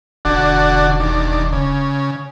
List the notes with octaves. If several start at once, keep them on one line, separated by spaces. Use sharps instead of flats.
E1 D3 D4 F#4
D#2 D4
C#3